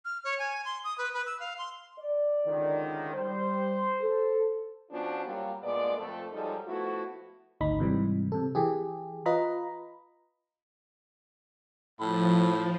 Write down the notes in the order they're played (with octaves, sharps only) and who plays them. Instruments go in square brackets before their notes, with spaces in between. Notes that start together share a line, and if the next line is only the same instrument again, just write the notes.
[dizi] F6
C#5
G#5
C6
D#6
B4
B4
E6
F5
C6
[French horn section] D5
[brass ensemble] C#2 D3 D#3
[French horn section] G3 [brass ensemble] C5
[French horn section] A4
F3 B3 C#4 D4 F4 F#4
F#3 G3 A#3 F4
G2 A#2 G#3 B3 D5
F2 A3 A4
F#2 F3 G3 G#3 D#4 A4
F3 A3 B3 E4 F#4
[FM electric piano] G#1 D2 D#4 B5
G#2 C3 E3 G3
C3 A4
E3 G4 G#4
F4 B4 D#5 A#5 B5
[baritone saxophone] A2 [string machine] F3 [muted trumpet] B5